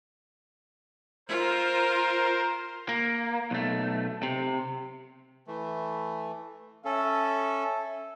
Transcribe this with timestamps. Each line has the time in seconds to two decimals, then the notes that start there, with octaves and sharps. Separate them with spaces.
1.29 F4 A#4 C5
2.89 A#3
3.51 B1 A3
4.23 C3
5.47 E3 A3
6.85 C#4 A4 E5